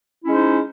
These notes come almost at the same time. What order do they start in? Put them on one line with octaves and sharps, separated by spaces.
E4 C#4 G#3 C5 D#4